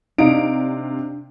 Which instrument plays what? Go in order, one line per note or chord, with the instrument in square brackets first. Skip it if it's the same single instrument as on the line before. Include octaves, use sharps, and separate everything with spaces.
[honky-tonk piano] C3 F5 D7 [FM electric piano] D4 [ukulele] D#4